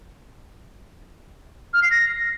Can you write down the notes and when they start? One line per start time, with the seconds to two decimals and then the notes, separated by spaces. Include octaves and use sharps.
1.74 F6
1.82 C7
1.91 A#6